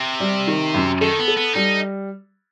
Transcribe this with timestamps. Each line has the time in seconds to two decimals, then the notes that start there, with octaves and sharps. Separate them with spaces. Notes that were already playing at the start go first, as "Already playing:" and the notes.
Already playing: C3
0.20 G3
0.47 D#3
0.74 F#2
1.01 D#3 A4
1.19 B3
1.28 A4
1.37 B3
1.54 G3 D#4